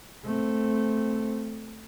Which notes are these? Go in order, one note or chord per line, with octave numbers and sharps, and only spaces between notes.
A3 C4